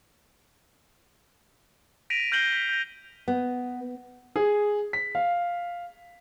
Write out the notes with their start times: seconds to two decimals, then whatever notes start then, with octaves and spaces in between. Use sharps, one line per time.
2.10 A#6 B6 D7 D#7 F7
2.32 F6 G6 A#6 C7 F#7 G7
2.53 B6
2.69 G6 A#6
3.28 B3
4.36 G#4
4.93 B6
5.15 F5